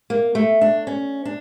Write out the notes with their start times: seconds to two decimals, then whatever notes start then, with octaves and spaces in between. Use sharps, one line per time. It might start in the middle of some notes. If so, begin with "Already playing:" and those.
0.10 A#3
0.35 A3
0.61 D4
0.87 C#4
1.25 D4